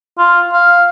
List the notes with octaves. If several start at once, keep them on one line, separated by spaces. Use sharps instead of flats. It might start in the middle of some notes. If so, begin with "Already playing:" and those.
F4
F5